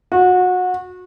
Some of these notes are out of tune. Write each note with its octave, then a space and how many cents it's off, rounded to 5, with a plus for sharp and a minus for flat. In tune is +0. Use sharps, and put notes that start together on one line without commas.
F#4 -25